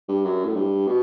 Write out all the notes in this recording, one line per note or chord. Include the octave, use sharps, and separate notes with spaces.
G2
F#2
A2
G2
B2